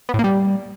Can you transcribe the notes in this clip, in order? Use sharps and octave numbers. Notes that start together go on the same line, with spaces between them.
B3
A2
A#3
G3